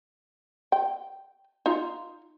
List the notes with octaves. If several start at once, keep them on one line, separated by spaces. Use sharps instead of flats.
G5
D#4 F4